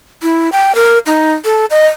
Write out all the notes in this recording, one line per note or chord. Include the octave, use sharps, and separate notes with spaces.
E4
G5
A#4
D#4
A4
D#5